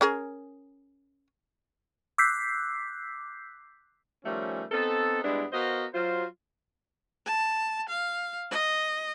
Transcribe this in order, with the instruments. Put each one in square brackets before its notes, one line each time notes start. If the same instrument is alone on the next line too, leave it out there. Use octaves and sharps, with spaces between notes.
[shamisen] C#4 G#4 A#4
[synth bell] D6 E6 F#6 G6 B6 C7
[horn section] D#3 F3 G3 A3 C#4
B3 C4 D#4 A4
G2 G#3 B3 D4 E4
B3 F#4 A#4 C5 D#5 F5
F#3 F4 C5
[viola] A5
F5
D#5